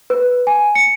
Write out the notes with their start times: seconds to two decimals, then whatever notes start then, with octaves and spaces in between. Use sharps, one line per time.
0.10 B4
0.47 G#5
0.75 C#7